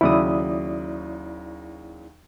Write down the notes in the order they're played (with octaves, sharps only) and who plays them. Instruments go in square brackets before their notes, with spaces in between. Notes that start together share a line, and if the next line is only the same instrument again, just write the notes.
[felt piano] D#2 C#3 F#3 [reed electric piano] E4 D5 D#6